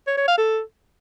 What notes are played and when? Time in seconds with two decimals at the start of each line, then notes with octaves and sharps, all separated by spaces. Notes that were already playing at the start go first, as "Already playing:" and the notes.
0.07 C#5
0.17 C#5
0.28 F5
0.38 A4